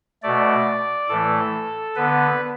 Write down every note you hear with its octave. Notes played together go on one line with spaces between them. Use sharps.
B2 A3 D5
A2 E3 A3 A4
D3 B3 B4